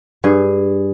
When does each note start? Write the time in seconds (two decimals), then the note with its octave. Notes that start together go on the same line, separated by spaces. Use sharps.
0.24 G2 G#4